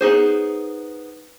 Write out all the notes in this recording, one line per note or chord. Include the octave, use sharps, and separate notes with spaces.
B3 D#4 G#4 C5